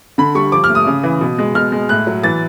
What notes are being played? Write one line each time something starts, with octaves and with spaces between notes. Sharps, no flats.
D3 B5
G3 C#6
F3 D6
F6
A3
D#6
C#3
E3
B2
G#3
B2 F6
G#3
A2 F#6
F#3
E3 A6